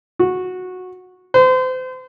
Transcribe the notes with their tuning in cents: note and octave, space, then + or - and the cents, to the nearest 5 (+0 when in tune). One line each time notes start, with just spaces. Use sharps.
F#4 -15
C5 -35